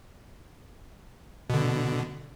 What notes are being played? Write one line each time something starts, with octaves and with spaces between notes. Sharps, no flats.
B2 D3